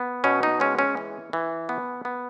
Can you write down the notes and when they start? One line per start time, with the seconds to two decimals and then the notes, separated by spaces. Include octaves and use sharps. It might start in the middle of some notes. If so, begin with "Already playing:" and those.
Already playing: B3
0.24 B2 C#4
0.43 D#4
0.60 G#3 C#4
0.79 C#4
0.97 E3
1.33 E3
1.69 B3
2.05 B3